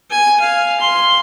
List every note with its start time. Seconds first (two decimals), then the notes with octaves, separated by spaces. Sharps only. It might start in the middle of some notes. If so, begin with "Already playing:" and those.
0.11 G#5
0.40 F5
0.80 C6